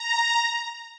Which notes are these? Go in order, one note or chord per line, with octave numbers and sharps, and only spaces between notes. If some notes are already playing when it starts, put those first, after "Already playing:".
Already playing: A#5